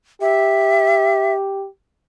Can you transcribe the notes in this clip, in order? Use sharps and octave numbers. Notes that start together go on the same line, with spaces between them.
G4 E5